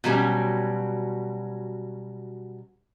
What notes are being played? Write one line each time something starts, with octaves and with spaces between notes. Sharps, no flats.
B2 F#3 G3 C#4